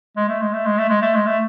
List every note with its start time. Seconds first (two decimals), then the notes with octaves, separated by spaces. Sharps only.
0.17 G#3
0.28 A3
0.41 G#3
0.53 A3
0.66 G#3
0.78 A3
0.89 G#3
1.02 A3
1.15 G#3
1.26 A3